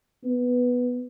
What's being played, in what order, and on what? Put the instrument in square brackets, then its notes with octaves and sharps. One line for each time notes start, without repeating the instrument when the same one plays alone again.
[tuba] B3